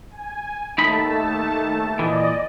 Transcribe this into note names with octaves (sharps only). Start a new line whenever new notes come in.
G#5
D#2 A3 D#4 A5 B5
A#2 E3 D5 D#5